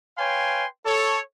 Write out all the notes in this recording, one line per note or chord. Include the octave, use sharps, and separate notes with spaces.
B4 C#5 F5 G5 G#5 C6
A4 C#5